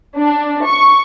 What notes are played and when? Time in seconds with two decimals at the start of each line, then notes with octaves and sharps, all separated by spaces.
0.17 D4
0.65 C#6